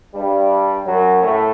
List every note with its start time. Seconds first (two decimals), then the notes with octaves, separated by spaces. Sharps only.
0.14 G2 G3
0.86 F#2 F#3
1.22 A2 A3